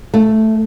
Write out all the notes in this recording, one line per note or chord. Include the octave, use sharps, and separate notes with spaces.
A3